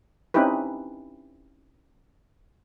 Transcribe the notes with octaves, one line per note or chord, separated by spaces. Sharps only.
C4 C#4 D#4 E4 G4 B4